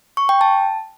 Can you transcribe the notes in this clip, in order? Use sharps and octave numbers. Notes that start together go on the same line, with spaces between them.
C#6
G5
A5